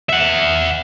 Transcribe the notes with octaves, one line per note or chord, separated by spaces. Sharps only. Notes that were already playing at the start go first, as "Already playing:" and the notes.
E5 F#5